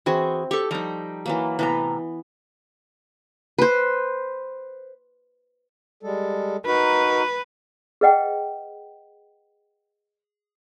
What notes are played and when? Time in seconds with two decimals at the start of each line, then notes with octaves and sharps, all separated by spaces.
0.06 E3 C4 F#4 G#4
0.51 G4 A4 C#6
0.71 F3 G3 D#4 A#5
1.26 E3 F#3 A#3
1.59 A2 C3 E3 B3 A#5
3.58 B4 C5
6.03 G3 G#3 A4
6.66 D#4 F#4 A#4 B4
8.01 G#4 B4 D#5 F#5 G5